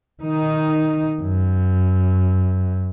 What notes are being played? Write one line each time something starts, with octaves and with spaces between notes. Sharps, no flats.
D#3 D#4
F#2